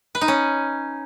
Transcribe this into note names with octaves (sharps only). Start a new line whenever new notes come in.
B4
D#4
C#4